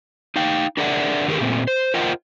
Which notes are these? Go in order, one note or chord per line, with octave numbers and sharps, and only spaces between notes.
D#4 F5 G5
D4 G#4 A#4 D5 E5 F#5
D3 D#3 G4 G#4 A#4
A#2 A3 C4
C5
F4 A#4 C5 D#5 F#5 G5